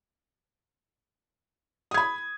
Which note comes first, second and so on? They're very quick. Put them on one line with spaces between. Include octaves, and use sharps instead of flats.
D#6 G#6 B5